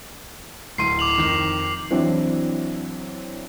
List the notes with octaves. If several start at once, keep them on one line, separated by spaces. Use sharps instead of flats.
D1 C6 C7 D#7
D6 F7 F#7
F2 D#3
E3 F#3 C4 D4 E4